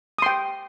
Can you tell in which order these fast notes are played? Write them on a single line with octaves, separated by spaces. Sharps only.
D#6 C6 G5